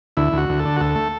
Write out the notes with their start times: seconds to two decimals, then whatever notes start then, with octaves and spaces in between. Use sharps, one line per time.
0.17 D2 E4
0.33 D2 F#4
0.49 D2
0.59 A4
0.65 D3
0.77 F#4
0.80 D2 A4
0.95 A3